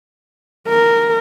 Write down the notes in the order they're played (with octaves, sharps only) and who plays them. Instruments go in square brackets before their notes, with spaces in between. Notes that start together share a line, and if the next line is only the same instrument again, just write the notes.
[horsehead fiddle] A#4